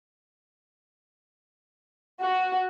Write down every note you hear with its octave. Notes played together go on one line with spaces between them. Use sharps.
F#4